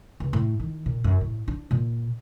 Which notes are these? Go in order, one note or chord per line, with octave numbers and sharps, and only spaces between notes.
C#2
A2
D#3
A#2
F#2
A2
D4
A#2